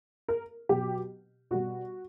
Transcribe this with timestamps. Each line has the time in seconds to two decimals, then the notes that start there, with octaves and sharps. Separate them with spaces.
0.28 A#4
0.69 B2 F#3 G4
1.51 B2 G3 F#4